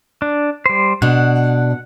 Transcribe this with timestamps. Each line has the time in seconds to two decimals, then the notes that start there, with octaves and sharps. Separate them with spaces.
0.22 D4
0.66 G3 C5
1.02 B2 D4 F#5